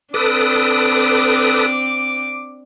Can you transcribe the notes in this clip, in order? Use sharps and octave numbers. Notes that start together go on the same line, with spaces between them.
C4 D4 A4 B4 D6 D#6